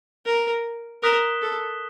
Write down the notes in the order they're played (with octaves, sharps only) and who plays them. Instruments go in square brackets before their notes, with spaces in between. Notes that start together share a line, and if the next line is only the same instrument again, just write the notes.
[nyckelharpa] A#4
[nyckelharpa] A#4 [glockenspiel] D#6 F#6 B6 E7 G7
[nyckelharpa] A4